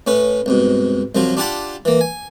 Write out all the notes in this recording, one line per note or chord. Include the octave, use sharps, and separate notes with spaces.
A2 C#4 B4
C2 G#2 B2
C2 F#2 F3 F#3 F4
D4 F4 G4 F#5 A5 B5
E3 A#3
G#5